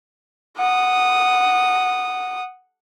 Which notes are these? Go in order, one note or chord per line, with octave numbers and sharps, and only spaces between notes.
F#5 D#6